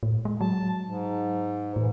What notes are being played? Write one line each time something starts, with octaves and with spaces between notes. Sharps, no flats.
A2
D2 G#3
F#3 A5
G#2
A2 E3